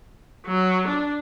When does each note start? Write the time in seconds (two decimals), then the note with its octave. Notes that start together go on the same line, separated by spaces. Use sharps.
0.46 F#3
0.88 D4